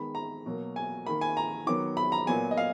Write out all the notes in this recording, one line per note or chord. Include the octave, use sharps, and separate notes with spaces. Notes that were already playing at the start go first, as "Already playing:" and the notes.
Already playing: D#3 G#3 B3 B5
A#5
B2 F#3 A#3
G#5
D#3 A#3 B5
G#5
A#5
D#3 F#3 B3 D6
B5
A#5
A#2 F#3 B3 G#5
D#5
F5